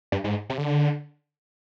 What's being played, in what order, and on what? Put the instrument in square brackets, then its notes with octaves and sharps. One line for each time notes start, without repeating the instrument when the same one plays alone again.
[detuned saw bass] G2
G#2
C3
D3